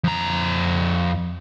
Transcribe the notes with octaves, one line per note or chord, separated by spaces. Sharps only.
F2 A#5